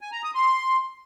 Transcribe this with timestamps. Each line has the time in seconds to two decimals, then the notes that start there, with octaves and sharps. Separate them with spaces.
0.01 G#5
0.12 A#5
0.23 D#6
0.35 C6